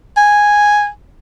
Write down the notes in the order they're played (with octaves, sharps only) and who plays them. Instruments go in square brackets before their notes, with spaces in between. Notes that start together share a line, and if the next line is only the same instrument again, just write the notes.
[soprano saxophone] G#5